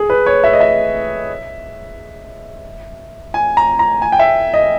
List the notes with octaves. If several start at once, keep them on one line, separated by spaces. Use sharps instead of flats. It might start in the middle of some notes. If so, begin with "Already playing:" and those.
Already playing: G#4
B4
C#5
E5
D#5
E5
G#5
A#5
A#5
G#5
G5
E5
D#5